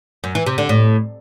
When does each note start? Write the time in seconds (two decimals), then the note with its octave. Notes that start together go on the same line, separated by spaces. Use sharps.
0.24 F#2
0.35 E3
0.46 C3
0.58 D3
0.69 A2